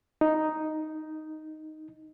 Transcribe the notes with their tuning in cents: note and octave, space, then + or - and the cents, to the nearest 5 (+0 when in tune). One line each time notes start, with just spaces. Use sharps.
D#4 +0